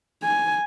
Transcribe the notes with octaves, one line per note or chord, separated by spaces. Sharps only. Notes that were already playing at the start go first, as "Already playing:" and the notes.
G#5